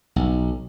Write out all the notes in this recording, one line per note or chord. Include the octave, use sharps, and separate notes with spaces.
B1